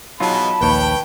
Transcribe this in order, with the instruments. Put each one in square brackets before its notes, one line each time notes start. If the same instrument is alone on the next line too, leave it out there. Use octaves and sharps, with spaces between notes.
[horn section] B2 E3 G#3 [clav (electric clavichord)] F#3 D#4 F4 [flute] A5 [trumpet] B5
[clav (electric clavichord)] A#1 D#2 [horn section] B4 C#5 G5